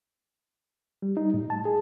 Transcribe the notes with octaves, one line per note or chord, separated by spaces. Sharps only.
G3
D#4
A2
A5
G#4